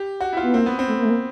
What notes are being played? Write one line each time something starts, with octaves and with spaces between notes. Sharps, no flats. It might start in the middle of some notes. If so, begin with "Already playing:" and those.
Already playing: G4
F#4
E4
F4
B3
A#3 C4
B3
C4
A3
A#3
A3
A#3